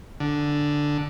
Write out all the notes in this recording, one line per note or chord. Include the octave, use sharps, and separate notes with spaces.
D3